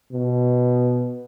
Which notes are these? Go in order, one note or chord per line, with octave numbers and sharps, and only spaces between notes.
B2